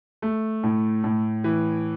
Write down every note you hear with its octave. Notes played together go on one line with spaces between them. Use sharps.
A3
A2
A2
E3